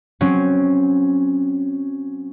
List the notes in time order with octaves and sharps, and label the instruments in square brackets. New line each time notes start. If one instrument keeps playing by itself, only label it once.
[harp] F#3 C4 C#4